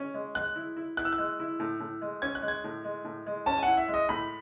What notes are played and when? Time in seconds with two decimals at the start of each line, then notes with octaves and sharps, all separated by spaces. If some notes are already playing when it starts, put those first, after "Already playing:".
Already playing: C#4
0.14 G#3
0.35 G#3 F#6
0.55 E4
0.76 E4
0.97 E4 F#6
1.05 E6
1.13 F#6
1.18 G#3
1.39 E4
1.60 A2
1.80 A2
2.01 G#3
2.22 C#4 G#6
2.35 F#6
2.42 G#3
2.48 G#6
2.64 A2
2.84 G#3
3.05 A2
3.26 G#3
3.46 C#4 A5
3.58 G#5
3.63 E4 F#5
3.77 E5
3.88 G#3
3.94 D#5
4.09 A2 B5